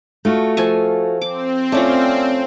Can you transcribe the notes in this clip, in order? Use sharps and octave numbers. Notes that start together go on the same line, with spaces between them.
A3 F4 F#4
F3 A4 G#5
C4 D6
A3 C#4 F4 D5